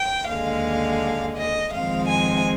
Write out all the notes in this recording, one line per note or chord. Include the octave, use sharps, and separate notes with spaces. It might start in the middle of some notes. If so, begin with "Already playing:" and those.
Already playing: G5
D#2 D3 G#3 F5
D#5
F2 D#3 G#3 C4 F5
G#5